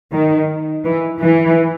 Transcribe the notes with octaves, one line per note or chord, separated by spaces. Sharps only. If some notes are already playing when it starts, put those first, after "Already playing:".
D#3
E3
E3